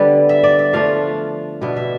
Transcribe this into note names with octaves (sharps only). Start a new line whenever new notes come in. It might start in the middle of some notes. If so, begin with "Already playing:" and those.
Already playing: D3 G3 B3 D5
E5
D5
E5
F3 A3 D4 F4 F5
B2 B3 D4 E5
E5